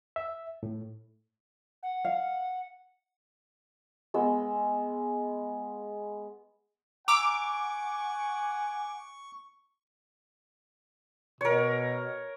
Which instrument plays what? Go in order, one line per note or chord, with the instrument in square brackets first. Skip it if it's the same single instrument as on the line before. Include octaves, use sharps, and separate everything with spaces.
[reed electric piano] E5
A2
[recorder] F#5
[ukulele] F5
[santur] G#3 B3 E6
[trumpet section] F#5 G#5 [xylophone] A#5 E6 [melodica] C#6 [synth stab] D6
[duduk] B2 [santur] A#4 C#5